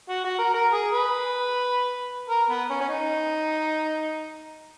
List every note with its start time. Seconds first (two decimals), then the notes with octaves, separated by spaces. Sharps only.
0.09 F#4
0.24 F#4
0.39 A#4
0.54 A#4
0.73 G#4
0.93 B4
2.30 A#4
2.50 B3
2.70 C#4
2.81 C#4
2.89 D#4